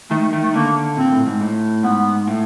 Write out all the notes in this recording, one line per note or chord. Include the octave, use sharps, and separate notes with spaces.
D#3 A3
A3
D#3 A3
A3
D3 A#3
A#2 C4
A2
G#2
A2
G#2 B3
A2